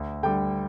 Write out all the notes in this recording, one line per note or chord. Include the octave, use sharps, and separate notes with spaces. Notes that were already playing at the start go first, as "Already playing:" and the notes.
Already playing: D2
D3 G3 G5